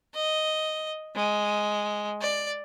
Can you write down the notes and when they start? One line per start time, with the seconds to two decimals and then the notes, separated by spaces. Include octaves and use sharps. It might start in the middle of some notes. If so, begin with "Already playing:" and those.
0.15 D#5
1.16 G#3
2.21 D5